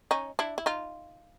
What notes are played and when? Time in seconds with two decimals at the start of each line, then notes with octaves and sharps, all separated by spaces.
0.11 C#4 D#4
0.39 D4 E4
0.58 E4
0.66 D#4 F4